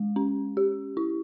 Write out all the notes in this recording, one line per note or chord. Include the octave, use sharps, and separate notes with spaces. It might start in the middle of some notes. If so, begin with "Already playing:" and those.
Already playing: G#3
C#4
G4
E4